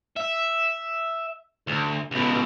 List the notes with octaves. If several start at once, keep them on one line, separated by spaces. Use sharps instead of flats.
E5
D2
C#2 B2